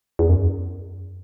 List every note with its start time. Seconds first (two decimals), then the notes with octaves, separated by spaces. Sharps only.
0.19 E2
0.29 F#2